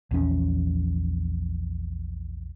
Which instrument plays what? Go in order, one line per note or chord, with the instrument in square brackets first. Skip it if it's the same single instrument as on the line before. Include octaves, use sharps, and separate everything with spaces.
[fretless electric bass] A#1 E2 C#4